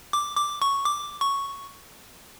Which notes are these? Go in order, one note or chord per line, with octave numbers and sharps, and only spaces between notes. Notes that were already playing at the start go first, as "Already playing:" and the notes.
D6
D6
C#6
D6
C#6